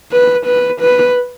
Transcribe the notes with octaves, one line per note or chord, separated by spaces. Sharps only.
B4
B4
B4